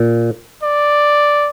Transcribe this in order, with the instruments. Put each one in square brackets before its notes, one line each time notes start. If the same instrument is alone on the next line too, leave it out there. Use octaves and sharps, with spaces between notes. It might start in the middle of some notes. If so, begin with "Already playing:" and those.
Already playing: [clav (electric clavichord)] A#2
[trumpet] D5